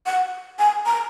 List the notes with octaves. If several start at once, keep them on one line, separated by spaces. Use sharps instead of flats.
F#5
G#5
A#5